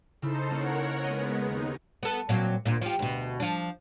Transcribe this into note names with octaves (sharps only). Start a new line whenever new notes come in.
C#3 D#4 E4 A4 C5 E6
A#3 C#4 A#4 C#5 F#5
G#3 B3 D#5
D#2 D#4
B3 A4
A#2 F#3 C4
D2 A#2
F3 G4
D2 B2
F3 D4